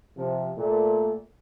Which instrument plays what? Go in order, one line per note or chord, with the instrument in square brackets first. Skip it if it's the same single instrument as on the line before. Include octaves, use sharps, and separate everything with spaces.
[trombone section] C3 F3
A#2 A3